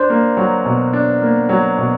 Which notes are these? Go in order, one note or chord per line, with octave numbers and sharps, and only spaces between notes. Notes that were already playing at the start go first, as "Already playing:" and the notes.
Already playing: D4 C5
A#3
F#3
B2
D4
A#3
F#3
B2